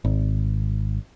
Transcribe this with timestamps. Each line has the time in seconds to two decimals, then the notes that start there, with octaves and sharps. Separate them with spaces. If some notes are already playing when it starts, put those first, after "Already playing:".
0.05 G#1